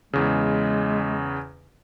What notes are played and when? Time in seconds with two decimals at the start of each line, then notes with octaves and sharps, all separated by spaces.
0.13 E2 C#3 G#3